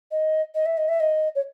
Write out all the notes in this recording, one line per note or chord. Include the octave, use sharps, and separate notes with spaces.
D#5
D#5
E5
D#5
E5
D#5
C#5